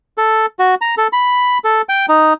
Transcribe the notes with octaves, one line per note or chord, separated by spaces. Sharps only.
A4
F#4
A#5
A4
B5
A4
G5
D#4